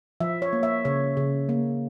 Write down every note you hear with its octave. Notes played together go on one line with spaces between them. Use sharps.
F3 E5
C#5
A#3
E5
C#3 C#5
C#3
A#3